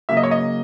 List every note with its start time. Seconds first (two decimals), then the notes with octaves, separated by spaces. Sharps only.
0.09 C#3 F#3 A#3 E5
0.17 D#5
0.23 C#5
0.31 D#5